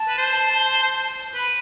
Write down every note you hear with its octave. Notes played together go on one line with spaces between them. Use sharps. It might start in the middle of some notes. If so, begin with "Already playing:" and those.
Already playing: A5
B4
C5
B4 B5